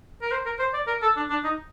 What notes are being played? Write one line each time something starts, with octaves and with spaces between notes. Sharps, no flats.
A#4
C5
A#4
C5
D5
A#4
A4
D4
D4
D#4